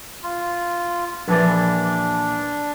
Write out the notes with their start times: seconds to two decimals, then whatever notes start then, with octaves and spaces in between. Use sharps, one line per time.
0.23 F4
1.28 A#1 E3 D4 D5